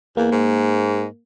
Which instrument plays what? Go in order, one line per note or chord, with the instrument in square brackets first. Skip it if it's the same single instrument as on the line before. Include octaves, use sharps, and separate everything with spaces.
[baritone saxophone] E2 [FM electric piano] A#3
[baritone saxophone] G#2